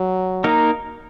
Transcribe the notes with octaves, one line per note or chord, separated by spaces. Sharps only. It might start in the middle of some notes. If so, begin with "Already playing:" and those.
Already playing: F#3
A#3 D#4 A#4